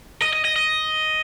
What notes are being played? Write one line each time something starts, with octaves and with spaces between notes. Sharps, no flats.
D#5
D#5
D#5
D#5